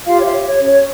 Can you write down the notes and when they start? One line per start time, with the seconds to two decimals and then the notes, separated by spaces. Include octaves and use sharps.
0.06 F4 G4 F5
0.18 C#5
0.26 E5
0.32 C#5
0.41 E5
0.47 C#5
0.59 C#4
0.65 C#5